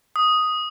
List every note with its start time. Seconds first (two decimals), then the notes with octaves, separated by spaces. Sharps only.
0.16 D#6